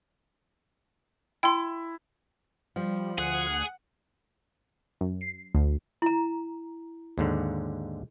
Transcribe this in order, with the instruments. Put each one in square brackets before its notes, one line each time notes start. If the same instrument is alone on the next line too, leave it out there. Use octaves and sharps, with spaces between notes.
[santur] E4 [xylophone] G5 C6
[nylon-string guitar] F3 [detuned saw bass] G3
[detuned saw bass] D2 [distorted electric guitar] G#4 [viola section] F#5
[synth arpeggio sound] F#2
C7
D2
[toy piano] E4 A#5
[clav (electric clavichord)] D#2 G#2 D3